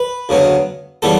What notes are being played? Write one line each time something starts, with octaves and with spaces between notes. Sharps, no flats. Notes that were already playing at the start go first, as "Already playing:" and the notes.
Already playing: B4
D2 C#3 F#3 B3
C#3 E3 G3 B3 A4